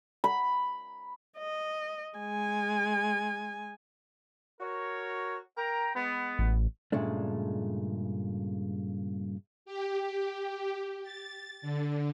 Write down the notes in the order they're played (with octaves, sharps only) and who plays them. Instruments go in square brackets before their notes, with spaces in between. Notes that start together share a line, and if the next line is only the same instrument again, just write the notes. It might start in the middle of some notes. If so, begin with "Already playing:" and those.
[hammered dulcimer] B5
[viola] D#5
G#3 G#5
[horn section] F#4 A#4 C#5
A#4 G5 A#5
G#3 B3
[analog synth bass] A1
[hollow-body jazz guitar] G2 A#2 C#3 G#3 A3 D4
[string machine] G4
A6
D3